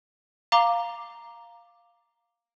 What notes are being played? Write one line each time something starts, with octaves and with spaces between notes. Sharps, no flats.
F5 A#5 D6 G7